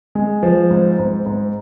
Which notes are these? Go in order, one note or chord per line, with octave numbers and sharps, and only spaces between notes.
G#3
F3
G#2
G#2
G#2